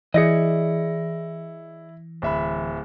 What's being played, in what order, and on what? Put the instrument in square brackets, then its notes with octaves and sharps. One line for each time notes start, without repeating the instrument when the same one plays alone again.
[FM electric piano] E3 [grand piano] E4 A#6 C#7 [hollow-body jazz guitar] G#4 D5 D#5
[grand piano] D1 E5 B5